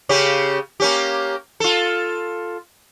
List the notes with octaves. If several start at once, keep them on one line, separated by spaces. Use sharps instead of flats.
C#3 C#4 G4
A#3 C#4 G4
F4 A4